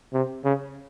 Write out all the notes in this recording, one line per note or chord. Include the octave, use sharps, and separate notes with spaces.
C3
C#3